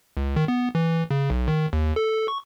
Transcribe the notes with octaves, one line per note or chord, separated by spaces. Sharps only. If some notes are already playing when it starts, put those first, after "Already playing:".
C#2
D#3
B3
E3
C#3
B1
D#3
D#2
A4
C#6